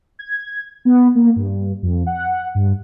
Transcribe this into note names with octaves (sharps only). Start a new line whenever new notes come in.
G#6
B3
A#3
G2
F2
F#5
G2